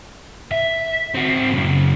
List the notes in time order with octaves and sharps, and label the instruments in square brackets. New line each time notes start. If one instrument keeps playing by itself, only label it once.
[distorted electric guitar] E5
C4 F#4
F#2 C#3